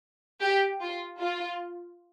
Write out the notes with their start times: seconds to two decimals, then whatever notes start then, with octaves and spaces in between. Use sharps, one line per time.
0.41 G4
0.80 F4
1.20 F4